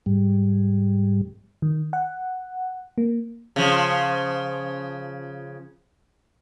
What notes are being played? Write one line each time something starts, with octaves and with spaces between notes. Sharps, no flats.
G#2 G3
D#3
F#5
A#3
C#3 F3